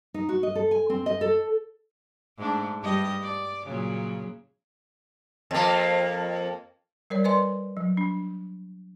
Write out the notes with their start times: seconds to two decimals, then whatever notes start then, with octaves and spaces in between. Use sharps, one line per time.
0.14 D#4
0.29 F#4
0.43 D#5
0.55 A4
0.71 G#5
0.90 C4
1.06 D#5
1.21 A4
2.37 G#2 A3 D4
2.82 G2 G3 D#5
3.22 D5
3.65 A#2 C#3 F#3
5.51 F2 A#3
7.10 G3 A#4 C#5 D5
7.24 B4 C5 D5 D#5 G#5 C6
7.77 F#3
7.97 D4